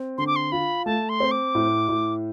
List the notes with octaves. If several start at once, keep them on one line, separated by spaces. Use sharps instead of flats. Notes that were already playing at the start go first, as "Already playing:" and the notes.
Already playing: C4
D3 C6
D6
C6
F4 B5
A3 A5
C6
C4
D6
A2
A2